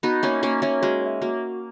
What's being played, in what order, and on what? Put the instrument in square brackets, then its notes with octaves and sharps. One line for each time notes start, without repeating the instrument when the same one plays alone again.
[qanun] B3 D#4 [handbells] F#4
[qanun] A#3 C#4 [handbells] C#5 E5
[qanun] A#3 C#4 [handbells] F#4
[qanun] A#3 C#4 [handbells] C#5 E5
[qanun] G#3 [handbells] F#4
[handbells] C#5 E5
[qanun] A#3 [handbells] F#4